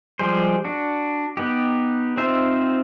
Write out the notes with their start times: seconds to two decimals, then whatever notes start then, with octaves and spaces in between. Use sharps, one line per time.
0.19 F3 G3 G#3 G#4 C5
0.64 D4 F#4
1.37 B3 D#4 G4
2.17 C4 D#4 F4 C5 E5